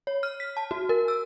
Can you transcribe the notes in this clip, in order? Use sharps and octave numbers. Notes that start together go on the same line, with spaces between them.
C#5
F6
B6
A5
F#4
A#4
E6